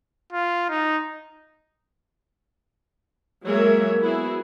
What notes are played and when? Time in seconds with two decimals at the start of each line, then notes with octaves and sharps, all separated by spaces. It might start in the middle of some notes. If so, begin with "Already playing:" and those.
0.32 F4
0.69 D#4
3.45 F#3 G#3 A#3 A#4 C#5 E5
4.01 B3 E4 F#4 G#4